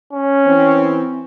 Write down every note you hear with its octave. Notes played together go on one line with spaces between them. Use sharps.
C#4
E3 C4